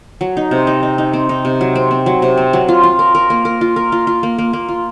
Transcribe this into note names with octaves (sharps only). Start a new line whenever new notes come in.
F#3
D#4
C3
D#4
D#4
D#4
C4
D#4
C3
F#3
C4
C4
F#3
C3
C4
F#3
F4
F4
A#4
A#4
A#3
A#4
F4
A#4
F4
F4
A#3
A#3
A#3
F4